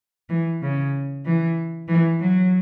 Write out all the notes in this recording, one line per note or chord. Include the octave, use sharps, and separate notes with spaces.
E3
C#3
E3
E3
F#3